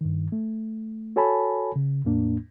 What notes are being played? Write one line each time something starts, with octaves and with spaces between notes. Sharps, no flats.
G2 D#3
A3
F#4 A4 C#5 G#5 A5 B5
C#3
E2 A2 A#3 D4